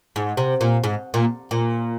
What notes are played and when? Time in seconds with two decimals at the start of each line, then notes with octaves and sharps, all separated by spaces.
0.16 G#2
0.37 C3
0.61 A#2
0.84 G#2
1.14 A#2
1.51 A#2